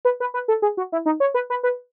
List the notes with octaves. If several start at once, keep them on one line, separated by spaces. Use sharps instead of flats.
B4
B4
B4
A4
G#4
F#4
E4
D#4
C#5
B4
B4
B4